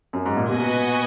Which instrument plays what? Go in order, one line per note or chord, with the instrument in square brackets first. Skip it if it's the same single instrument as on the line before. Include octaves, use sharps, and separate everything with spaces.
[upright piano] F#2
G#2
A#2
[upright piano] B2 [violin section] F#4 B4 D#5 G#5